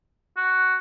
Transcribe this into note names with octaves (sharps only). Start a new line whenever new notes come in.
F#4